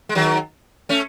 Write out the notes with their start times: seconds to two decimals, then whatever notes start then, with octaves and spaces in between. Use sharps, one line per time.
0.09 G#3
0.15 D#3 F#3
0.89 A3 C#4